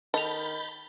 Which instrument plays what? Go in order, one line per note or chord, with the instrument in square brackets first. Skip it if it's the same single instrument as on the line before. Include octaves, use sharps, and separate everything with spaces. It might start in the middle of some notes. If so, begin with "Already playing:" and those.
[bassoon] D#3 [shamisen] A4 [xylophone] D#5 F7 [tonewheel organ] B5 G6 A6